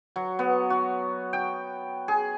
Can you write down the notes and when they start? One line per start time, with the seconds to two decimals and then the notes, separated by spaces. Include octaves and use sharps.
0.16 F#3
0.39 B3
0.70 F#4
1.33 G5
2.08 G#4